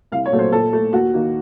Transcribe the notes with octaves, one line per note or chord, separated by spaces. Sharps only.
C2 F5
C#5
A#2 F#3 A3
C5
A#2 A4
A3
D#2 F#4
D#3 A#3